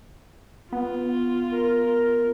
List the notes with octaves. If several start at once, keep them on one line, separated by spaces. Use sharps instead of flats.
B3 F4
A#4